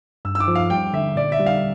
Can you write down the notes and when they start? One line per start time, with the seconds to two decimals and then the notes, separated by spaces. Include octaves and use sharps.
0.25 G2 E6
0.35 E6
0.40 D6
0.48 F3
0.55 F5
0.70 G3 G5
0.93 D3 E5
1.16 A#2 D5
1.32 E5
1.39 G3
1.46 F5